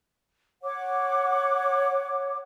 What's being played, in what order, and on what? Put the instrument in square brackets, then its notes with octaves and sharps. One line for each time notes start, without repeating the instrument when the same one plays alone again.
[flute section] C#5 F#5 D6